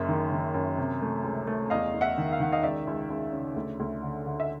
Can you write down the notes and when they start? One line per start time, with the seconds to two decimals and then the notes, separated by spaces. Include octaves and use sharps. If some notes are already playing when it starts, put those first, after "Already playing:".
Already playing: F#1 F#2 E5
0.09 D#3
0.32 D#3
0.54 F#2
0.78 C3
1.02 A3
1.24 C#2
1.47 A3
1.70 E2 D#5 F5
1.94 E2
2.01 E5 F#5
2.18 D#3
2.33 F5
2.40 D#3 F#5
2.52 D#5 F5
2.63 C#2 D5 E5
2.87 C#2
3.10 C#2
3.32 C#3
3.56 D2
3.80 D2
4.03 D3
4.26 D3
4.40 E5